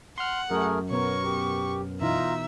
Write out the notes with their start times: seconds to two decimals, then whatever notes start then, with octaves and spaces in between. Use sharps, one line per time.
0.18 F#5 C6 F6
0.51 F#2 A3 G#4 A#4
0.91 B2 B3 A#4 C#5 C#6
1.24 G4
2.01 B2 E3 D#4 F4 E5 A#5